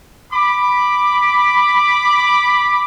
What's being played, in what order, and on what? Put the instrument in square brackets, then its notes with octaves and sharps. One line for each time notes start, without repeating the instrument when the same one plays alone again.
[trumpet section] B5 D6